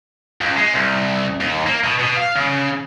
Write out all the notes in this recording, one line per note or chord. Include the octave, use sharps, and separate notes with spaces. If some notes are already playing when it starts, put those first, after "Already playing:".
C#2
G#3
C2
D#2
A#3
B2
B2
F5
C#3